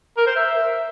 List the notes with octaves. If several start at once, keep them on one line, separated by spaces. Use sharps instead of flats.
A#4
C5
E5